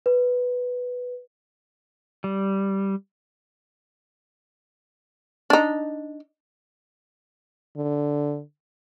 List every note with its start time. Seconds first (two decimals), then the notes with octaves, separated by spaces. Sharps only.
0.06 B4
2.24 G3
5.50 D4 D#4
7.77 D3